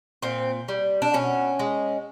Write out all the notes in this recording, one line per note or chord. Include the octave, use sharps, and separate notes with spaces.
A#2 C4
G3
D4
B2 C#4
G#3